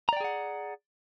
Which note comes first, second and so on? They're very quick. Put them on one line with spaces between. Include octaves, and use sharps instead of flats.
A#5 D5 G5 G#4 F#5